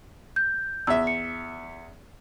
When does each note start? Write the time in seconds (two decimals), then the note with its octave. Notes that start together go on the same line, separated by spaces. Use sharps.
0.36 G6
0.87 E2 E5 E6
1.07 C#7